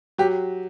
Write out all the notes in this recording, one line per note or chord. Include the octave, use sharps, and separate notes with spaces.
F#3 G4